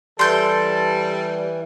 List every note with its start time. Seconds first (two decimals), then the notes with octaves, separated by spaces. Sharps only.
0.19 E3 G3 A4 C6 G6